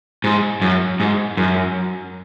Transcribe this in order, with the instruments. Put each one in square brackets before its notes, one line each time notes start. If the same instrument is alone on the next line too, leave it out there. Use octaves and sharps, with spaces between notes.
[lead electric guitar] G#2
F#2
G#2
F#2